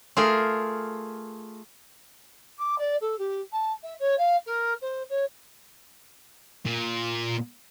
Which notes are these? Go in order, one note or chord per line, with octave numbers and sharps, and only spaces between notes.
A3 F4 G#4 A#4
D6
D5
A4
G4
A5
E5
C#5
F5
A#4
C5
C#5
A#2